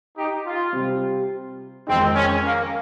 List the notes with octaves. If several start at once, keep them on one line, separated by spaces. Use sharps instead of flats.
D#4 G4
F4
C3 G3 C4
F2 D#3 G#3 C4 D#4
C#4
A#3